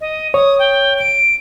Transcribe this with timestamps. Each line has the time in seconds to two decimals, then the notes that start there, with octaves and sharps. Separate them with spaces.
0.01 D#5
0.34 C#5 D#6
0.59 G5
0.99 D7